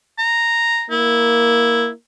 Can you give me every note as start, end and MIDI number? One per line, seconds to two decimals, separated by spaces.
0.18 0.85 82
0.90 1.89 58
0.90 1.89 64